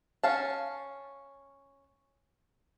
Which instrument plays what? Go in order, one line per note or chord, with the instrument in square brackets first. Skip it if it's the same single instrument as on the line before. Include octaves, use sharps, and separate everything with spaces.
[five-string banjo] C#4 F5 A5